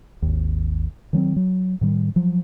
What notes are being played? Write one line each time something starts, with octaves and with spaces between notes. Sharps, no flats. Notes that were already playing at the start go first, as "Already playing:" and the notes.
G#1 D#2
D#3 F#3 B3 C4
F#3
A2 D#3 G3
F3 F#3